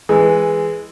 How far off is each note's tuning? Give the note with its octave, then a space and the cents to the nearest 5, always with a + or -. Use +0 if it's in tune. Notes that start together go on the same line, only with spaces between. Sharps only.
E3 +0 G#3 +0